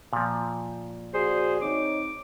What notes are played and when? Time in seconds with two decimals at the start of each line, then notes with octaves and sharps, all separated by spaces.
0.13 A#2 F3
1.14 F#4 G#4 C5 D5
1.62 C4 D#4 C#5 D6